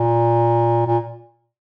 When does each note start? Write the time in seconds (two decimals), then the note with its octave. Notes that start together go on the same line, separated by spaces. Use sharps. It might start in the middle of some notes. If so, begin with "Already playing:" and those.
Already playing: A#2
0.87 A#2